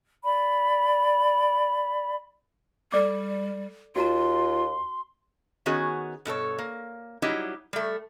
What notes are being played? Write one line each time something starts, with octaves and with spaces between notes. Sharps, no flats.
D5 B5
G3 A4 D5 D6
D#2 F4 F#4 A#5 C6
D#3 B3 C#4 F#4 G#4
G2 B2 A4 C#5
A#3
F#3 G3 D#4 E4 G4
G3 A3